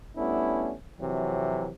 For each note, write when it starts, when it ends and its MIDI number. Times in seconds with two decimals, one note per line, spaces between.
0.17 0.74 55
0.17 0.74 57
0.17 0.74 59
0.17 0.74 61
0.17 0.74 62
0.17 0.74 64
0.99 1.71 41
0.99 1.71 48
0.99 1.71 52
0.99 1.71 54